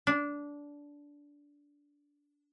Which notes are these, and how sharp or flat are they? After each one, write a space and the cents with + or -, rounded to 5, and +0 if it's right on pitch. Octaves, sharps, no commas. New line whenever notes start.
D4 -15